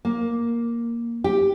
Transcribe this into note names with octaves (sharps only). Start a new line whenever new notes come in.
A#3
G4